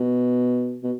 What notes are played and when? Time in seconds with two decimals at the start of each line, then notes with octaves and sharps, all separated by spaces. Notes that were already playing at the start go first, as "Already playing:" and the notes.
Already playing: B2
0.83 B2